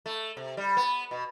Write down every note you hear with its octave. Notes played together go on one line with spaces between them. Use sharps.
A3
C3
G3
B3
B2